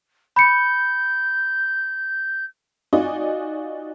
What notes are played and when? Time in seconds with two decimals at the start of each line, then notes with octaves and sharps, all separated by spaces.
0.36 B5 G6 C#7
2.93 D#4 F4 F#4 D5 D#5 G#5